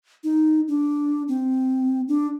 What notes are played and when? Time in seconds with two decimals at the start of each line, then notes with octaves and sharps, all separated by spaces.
0.24 D#4
0.68 D4
1.28 C4
2.08 D4